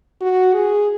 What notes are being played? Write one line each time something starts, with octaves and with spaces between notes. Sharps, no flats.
F#4
G#4